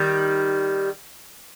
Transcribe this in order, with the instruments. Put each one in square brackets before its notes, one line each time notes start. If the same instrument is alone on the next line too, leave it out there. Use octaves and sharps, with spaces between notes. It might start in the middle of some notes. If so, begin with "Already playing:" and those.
Already playing: [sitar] D#3 G3